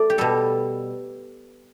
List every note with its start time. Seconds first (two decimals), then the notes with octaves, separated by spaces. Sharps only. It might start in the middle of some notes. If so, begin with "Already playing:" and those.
Already playing: A3 D5
0.10 G4
0.18 B2 G3 A4